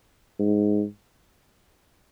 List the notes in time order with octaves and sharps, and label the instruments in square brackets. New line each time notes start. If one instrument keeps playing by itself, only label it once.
[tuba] G#2